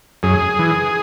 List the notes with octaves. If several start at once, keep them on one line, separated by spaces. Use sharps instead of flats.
F#2 G#4
E3